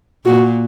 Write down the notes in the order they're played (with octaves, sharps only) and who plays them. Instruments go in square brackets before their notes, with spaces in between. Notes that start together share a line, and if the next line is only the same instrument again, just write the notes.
[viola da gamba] A#2 [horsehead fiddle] F#4